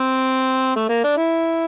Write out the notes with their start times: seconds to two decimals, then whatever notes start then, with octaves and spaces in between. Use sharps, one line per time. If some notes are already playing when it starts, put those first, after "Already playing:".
Already playing: C4
0.75 A3
0.89 A#3
1.04 D4
1.17 E4